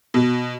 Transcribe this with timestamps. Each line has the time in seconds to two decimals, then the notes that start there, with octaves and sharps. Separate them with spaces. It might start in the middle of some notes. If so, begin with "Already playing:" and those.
0.14 B2